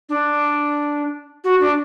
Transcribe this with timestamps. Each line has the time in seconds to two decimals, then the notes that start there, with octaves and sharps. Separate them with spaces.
0.09 D4
1.44 F#4
1.60 D4